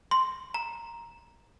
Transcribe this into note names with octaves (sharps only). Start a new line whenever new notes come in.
C6
A#5